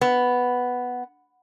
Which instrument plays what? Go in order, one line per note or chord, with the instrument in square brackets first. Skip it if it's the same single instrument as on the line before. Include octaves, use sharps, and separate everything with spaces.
[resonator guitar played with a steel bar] B3